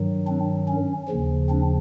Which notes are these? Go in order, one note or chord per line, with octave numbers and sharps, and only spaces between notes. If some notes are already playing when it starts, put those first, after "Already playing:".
Already playing: G2 D#3 F#3
C4 D4
C#4
D#2 C#3 F3
C4 D4